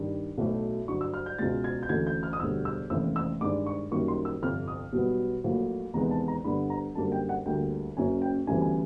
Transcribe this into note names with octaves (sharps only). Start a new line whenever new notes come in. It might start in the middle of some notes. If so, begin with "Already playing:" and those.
Already playing: G2 D#3 G3
B1 A2 F#3 A3
G2 D3 F#3 C#6
E6
F6
G6
C#2 B2 G#3 A6
G#6
G6
D2 C#3 E3 A3 G#6
G6
F6
D#6
E1 D2 D3 G3 E6
E6
F1 D#2 C#3 E3 E6
E6
G2 D#3 G#3 D6
C#6
F#2 D#3 G3 A#3 C#6
C6
E6
G1 F2 C3 F6
D#6
B1 B2 G3 B3
A#1 A2 F#3 A#3
E2 C3 D#3 G#3 B3 A#5
A5
A#5
G2 D3 G3 B3 B5
A#5
F#2 D3 G3 A#3 A5
G5
F#5
D2 D3 G3 A#3 G5
F#1 F#2 C#3 G#5
G5
D2 C#3 E3 G3 B3 G#5
G#5